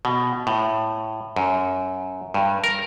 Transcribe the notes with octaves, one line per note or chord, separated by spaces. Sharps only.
B2
A2
F#2
G2
A#4